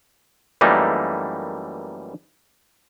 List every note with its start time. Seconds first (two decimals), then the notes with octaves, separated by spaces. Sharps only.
0.61 F#2 E3 G3 A3 A#3 D#4